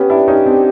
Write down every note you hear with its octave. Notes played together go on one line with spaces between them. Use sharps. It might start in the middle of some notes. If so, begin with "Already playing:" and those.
Already playing: B3 C#4 G4
D4 E4
C#4 D#4
C4 D4